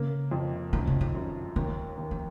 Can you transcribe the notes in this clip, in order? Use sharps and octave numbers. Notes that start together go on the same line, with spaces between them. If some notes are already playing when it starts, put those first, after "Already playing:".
Already playing: C#3 A#3
F2
F#2 D#3
C#3
D#3
F#2
D#2 D#3
D#2
F3